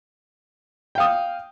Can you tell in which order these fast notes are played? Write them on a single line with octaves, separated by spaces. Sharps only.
G5 F5 D#6